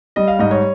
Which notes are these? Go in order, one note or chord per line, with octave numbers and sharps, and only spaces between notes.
G3 D#5
F5
G#2 D#5
C#5